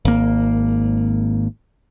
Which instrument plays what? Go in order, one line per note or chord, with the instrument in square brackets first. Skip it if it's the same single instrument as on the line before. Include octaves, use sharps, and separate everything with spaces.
[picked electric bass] G#1 A#3